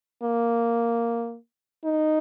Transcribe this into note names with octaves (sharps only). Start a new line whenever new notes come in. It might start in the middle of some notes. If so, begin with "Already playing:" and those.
A#3
D#4